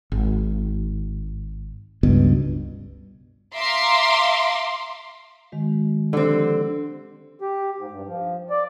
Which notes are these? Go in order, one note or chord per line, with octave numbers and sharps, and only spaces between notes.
G#1
C#2 G2 B2
E5 F5 A#5 C6 D6
D#3 G#3 F#4
D3 F3 C4 G4 A4
G4
G#2
G2
F3
D5